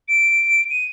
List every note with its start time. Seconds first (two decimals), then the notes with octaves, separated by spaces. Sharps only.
0.08 D7
0.70 D#7